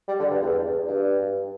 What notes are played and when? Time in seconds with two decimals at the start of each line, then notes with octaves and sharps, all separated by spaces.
0.08 G3
0.19 D3
0.31 G2
0.42 E2
0.88 G2